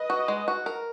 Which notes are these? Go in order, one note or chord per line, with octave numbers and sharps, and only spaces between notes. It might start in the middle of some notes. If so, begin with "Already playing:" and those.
Already playing: B4 D#5
F#4
G#3
F#4
A#4